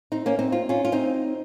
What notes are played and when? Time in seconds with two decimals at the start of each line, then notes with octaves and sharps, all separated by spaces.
0.12 C4 D#4
0.26 A#3 C#4
0.39 C4 D#4
0.52 F4
0.69 C#4 F4
0.85 F4
0.92 C4 D#4